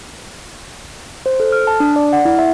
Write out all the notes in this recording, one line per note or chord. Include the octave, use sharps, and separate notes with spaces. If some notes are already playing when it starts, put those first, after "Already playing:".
C5
A4
F6
A5
D4
D5
F#5
E4
E5